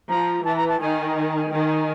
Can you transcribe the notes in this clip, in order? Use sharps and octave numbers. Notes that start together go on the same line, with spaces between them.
F3 A#5
E3 A5
A#5
A5
D#3 G#5
G#5
A#5
G#5
D#3 G5 G#5